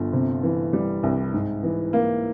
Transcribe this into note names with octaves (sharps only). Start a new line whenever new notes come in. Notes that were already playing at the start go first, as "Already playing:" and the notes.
Already playing: G1 F3
C3
E3
G3
C2
G#2
E3
A#3